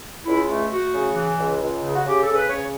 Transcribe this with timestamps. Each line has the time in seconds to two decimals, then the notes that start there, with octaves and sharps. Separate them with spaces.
0.25 C#2 E4
0.48 A3
0.69 A3 F#4
0.92 C#3
1.15 E3
1.37 C#2
1.59 C#2
1.82 C#3
1.94 F#4
2.05 C#3 G4
2.21 A4
2.27 C#3
2.35 B4
2.49 C#3 C#5